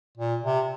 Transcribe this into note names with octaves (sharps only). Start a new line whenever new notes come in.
A#2
C3